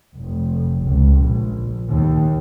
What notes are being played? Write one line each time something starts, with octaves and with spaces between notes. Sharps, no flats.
F1
C#2
A#1
D#2